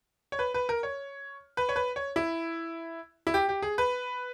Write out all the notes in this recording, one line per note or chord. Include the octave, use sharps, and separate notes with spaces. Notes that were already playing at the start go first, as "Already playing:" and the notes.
C#5
B4
B4
A#4
C#5
B4
C#5
B4
C#5
E4
E4
G4
G4
G#4
B4